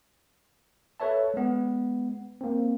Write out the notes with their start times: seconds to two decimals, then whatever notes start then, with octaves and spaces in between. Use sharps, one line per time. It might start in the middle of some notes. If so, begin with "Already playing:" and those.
1.00 A4 B4 C#5 E5 A5
1.34 G#3 B3
2.41 A#3 C4